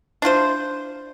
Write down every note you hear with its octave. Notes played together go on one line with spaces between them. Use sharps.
D4 E4 F4 C5